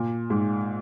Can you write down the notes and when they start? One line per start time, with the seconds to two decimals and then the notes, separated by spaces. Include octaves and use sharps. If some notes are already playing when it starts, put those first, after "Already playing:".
Already playing: A#2
0.30 G#2